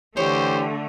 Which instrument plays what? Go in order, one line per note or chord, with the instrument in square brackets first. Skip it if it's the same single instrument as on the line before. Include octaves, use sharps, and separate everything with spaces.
[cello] D3 A3 [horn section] E3 G4 [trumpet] C5 [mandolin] C#5